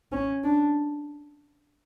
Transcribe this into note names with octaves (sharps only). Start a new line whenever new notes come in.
C#4
D4